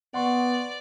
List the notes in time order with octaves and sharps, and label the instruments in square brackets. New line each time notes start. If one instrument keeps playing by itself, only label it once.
[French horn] B3 [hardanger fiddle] D5 [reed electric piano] F#5 C6 C#6